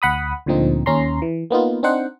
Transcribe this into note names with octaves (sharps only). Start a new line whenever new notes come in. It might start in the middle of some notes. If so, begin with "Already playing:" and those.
D2 F#5 B5 D#6
D2 A#2 D3 F3 C4 D#4
D#2 C#4 A#5 C6
E3
A#3 B3 D#4 F4
C4 D4 D#4 C5 F#5